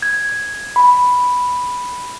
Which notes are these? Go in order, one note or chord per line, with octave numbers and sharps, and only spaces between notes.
G#6
B5